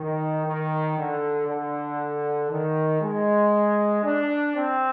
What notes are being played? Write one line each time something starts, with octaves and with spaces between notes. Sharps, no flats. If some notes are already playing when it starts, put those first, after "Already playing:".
Already playing: D#3
D#3
D3
D3
D#3
G#3
D4
C4